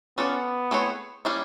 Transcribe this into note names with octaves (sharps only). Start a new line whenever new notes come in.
B3 C#4 F4 A4 D5
A3 C4 E4 G#4 C#5
G3 A#3 C#4 E4 G#4